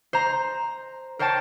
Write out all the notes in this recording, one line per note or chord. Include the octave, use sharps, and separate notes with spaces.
C5 A#5
A#4 C5 C#5 G5 A5